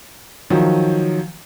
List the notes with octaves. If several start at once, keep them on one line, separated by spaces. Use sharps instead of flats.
D#3 F3 F#3